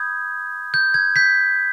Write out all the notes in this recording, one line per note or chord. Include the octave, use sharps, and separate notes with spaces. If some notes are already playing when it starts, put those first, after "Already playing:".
Already playing: B5 D#6 G6 G#6
G6
G#6
G6 B6